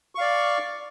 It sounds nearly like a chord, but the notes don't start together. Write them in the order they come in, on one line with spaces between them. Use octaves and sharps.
C#6 F5 D5